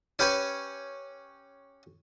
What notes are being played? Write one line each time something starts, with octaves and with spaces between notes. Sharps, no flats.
C#4 G4 B4 C#5 G#5